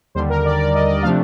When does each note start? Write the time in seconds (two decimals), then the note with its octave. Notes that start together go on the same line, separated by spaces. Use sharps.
0.15 D#2 D3 G3 C5
0.29 A#4
0.45 D5
0.60 D5
0.75 D#5
0.88 D5
1.03 C3 F3 A3 D4 F5